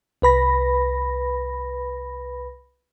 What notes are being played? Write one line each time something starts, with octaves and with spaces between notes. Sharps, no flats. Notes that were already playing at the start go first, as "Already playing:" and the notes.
C2 B4 B5 A#6